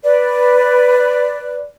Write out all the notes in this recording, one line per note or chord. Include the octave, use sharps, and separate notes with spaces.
B4 D5